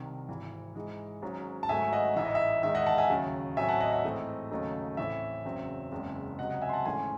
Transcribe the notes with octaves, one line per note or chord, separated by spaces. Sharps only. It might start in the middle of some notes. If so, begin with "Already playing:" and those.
Already playing: C2 C3 D#3
G#1 G#2 E3
G#2 E3 G#3
G#1 G#2 F#3 C#4
A5
G#1 G#2 F#3 A3 E5 G#5
D#5 F#5
A1 G#2 E3 E5
D#5
E5
E2 D#3 G#3 D#4 E5
D#5 F#5
F#5 A5
E5 G#5
D#2 C#3 F#3
A1 A2 F#3 C4 E5 G#5
F#5 A5
D#5 F#5
E5
G#2 E3 A3 C4 D#5
D#2 C#3 F#3 A3 D#4
A1 A2 E3 C4 E5
F#1 E2 C#3 F#3 C4
F#1 E2 C#3 G#3 C4
C#2 C3 F#3 D#5 F#5
D#5 F#5
E5 G#5
C6
F#5 A5
G#1 G#2 E3 A3 C#4 G#5 C6